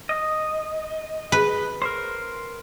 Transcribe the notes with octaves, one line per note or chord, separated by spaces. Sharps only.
D#5
B4
A#4 C5